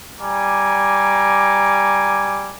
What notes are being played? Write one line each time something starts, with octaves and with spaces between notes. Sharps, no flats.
G3 G#5 A#5 D6